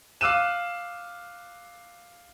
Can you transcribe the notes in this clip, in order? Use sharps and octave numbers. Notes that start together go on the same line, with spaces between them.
F5 D6 E6 F#6 D#7 E7